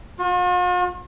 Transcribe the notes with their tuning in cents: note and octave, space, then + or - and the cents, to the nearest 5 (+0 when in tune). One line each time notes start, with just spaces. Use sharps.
F4 +45